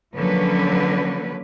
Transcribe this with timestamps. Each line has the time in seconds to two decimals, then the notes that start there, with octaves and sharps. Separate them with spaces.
0.15 D3 F3 F#3 A#3 C#4 B4